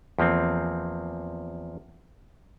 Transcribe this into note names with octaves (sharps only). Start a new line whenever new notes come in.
E2 F3 A#3 C4